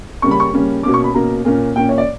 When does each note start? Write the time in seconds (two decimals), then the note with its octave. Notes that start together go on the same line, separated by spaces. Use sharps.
0.22 C#3 G3 A#3 C#4 C#6
0.31 B5
0.40 C#6
0.53 C#3 G3 A#3 C#4
0.83 B2 A#3 C#4 D6
0.94 C#6
1.04 B5
1.14 B2 A#3 C#4 A#5
1.45 A#2 A#3 C#4
1.76 A#2 A#3 C#4 G5
1.89 C#5
1.98 D5